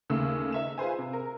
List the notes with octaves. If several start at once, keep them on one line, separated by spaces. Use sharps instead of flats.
D#2 C#3 A3 E6
D#4 E5 E7
F4 G#4 B4 C5 G#5
C3
A#4